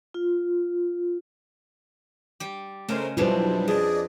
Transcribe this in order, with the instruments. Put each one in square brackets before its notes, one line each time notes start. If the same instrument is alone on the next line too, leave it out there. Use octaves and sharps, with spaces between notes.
[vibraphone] F4
[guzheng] G3 G4
[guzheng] C#3 G#3 [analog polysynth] A3 A#4 C5
[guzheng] F2 B2 D4 [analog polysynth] F#3 G3 E4 [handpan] F4 C5
[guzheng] F2 [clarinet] G#4 [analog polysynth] D5 D#5